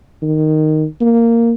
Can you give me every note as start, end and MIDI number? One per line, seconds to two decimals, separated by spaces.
0.22 0.85 51
1.01 1.54 58